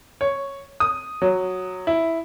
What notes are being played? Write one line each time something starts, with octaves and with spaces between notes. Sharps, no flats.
C#5
D#6
F#3
E4